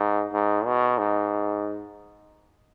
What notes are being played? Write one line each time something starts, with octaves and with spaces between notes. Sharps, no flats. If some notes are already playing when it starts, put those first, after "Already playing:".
Already playing: G#2
G#2
B2
G#2